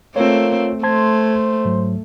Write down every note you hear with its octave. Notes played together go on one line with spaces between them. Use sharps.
A3 A#3 C4 F4 C#5
A3 C5 A5 C6 G#6
G#2 F#3